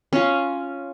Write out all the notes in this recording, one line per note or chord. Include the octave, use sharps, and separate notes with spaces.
C#4 F4